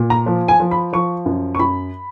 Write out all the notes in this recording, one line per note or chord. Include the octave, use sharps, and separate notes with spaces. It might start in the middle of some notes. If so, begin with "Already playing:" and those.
Already playing: A#2
A#5
F3
G#5
F3
B5
F3 C#6
F#2
C#6
F#2 B5